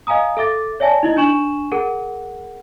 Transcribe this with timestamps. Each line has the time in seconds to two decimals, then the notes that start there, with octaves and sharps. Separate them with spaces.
0.07 D#5 F5 G#5 A#5 D#6
0.37 A4 E5 D6 A6
0.80 C#5 D5 E5 G#5 A5
1.03 D#4 E4 D#5
1.17 D4 G#5 C#6 E7 F#7
1.72 G#4 A#4 F#5